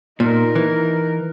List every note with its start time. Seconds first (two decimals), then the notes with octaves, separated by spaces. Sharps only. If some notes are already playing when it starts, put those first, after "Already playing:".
0.20 A#2 D#4 A#4
0.55 E3